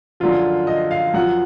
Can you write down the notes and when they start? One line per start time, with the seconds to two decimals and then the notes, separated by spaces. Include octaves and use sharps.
0.20 F#2 D3 F3 F4
0.67 D#5
0.91 F5
1.14 F#2 F3 F#5